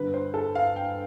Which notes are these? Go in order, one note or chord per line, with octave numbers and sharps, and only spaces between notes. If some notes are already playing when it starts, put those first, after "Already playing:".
Already playing: G1 G2 D3 B4
C5
A4
F5
G5